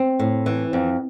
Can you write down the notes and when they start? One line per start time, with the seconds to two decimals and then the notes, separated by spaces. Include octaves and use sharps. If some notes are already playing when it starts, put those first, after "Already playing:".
Already playing: C4
0.19 A2
0.46 E3
0.73 F2